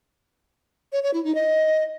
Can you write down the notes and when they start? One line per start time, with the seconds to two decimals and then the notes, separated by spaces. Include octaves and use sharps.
0.92 C#5
1.03 C#5
1.14 E4
1.24 D#4
1.35 D#5